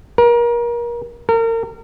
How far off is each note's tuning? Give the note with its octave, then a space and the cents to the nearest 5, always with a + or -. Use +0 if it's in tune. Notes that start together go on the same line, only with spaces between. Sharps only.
A#4 +30
A#4 -35